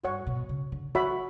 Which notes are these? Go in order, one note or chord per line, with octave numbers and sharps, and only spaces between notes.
G2 F#4 C#5 F#5 C#6
B2
C#3
D3
E3 F#4 C#5 E5 B5